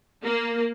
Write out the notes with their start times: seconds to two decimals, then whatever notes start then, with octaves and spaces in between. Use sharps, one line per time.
0.24 A#3